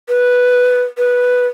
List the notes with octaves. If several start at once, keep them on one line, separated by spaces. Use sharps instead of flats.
B4
B4